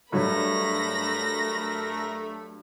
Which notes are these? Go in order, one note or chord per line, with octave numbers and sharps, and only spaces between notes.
G2 F#3 A3 A#4 B5 A#6